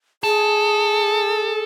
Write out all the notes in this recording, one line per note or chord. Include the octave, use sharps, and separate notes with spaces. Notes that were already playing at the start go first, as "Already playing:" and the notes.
G#4 A4